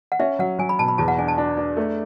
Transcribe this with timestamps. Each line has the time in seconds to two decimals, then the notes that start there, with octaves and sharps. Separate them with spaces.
0.12 F#5
0.19 C#4 E5
0.39 F#3 F#5
0.59 F#3 G#5
0.69 B5
0.79 B2 A5
0.88 B5
0.98 E2 A5
1.08 F#5
1.18 D4 G#5
1.28 A5
1.38 D4
1.57 D4
1.77 A3